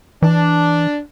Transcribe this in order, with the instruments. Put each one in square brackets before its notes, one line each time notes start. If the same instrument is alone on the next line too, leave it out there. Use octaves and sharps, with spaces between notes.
[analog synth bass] E3 [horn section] D4